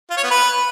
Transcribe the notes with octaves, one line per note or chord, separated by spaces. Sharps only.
F4
C#5
B3
B4